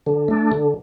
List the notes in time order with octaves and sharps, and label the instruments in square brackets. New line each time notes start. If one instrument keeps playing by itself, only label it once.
[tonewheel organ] D3
A3 D4
D3